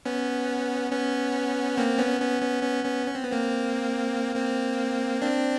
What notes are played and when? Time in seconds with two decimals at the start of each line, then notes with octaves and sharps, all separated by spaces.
0.05 B3 C#4
0.91 B3 C#4
1.77 A#3 C4
1.99 B3 C#4
2.20 B3 C#4
2.42 B3 C#4
2.63 B3 C#4
2.84 B3 C#4
3.06 C#4
3.15 C4
3.24 B3
3.32 A#3 C4
4.35 A#3 C4
5.22 C4 D4